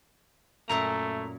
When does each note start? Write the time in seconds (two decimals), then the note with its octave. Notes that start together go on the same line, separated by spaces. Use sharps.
0.69 F#2 A#2 A3 E4 A#5